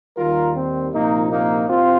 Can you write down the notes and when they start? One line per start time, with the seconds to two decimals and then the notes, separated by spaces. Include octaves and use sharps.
0.18 D#2 D#3 G3 F4 A#4
0.56 C4
0.93 C2 A#2 F3 A#3 D#4
1.31 A#3 D#4
1.68 C2 C4 F4